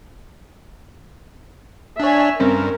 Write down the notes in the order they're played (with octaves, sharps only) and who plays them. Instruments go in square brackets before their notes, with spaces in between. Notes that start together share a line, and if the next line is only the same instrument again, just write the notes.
[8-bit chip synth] D4 C#5 [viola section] E5 G#5
[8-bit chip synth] G2 [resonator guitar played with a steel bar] C4 C#4 [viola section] A#4